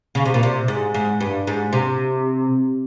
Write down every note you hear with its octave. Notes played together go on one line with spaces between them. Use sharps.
C#3
C3
A#2
C3
G#2
G#2
G2
G#2
C3